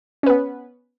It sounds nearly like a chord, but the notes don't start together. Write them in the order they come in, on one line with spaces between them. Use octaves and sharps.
C#4 B4 B3